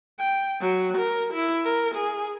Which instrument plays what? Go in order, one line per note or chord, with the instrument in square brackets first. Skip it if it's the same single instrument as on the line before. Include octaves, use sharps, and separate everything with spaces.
[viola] G5
F#3
A#4
E4
A#4
G#4